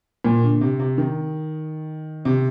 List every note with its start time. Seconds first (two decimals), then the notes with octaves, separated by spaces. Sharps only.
0.25 A#2
0.43 D3
0.61 C3
0.80 C3
0.98 D#3
2.25 C3